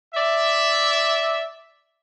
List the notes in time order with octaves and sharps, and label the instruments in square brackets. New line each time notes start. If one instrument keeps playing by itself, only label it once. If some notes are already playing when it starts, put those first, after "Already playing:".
[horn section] D5 E5